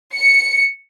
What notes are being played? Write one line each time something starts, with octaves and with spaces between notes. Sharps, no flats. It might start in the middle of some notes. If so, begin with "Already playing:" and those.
C#7